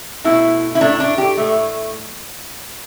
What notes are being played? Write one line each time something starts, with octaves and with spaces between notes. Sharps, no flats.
B2 A3 E4
E4
A2 A3 D4
D4
G4
A2 A3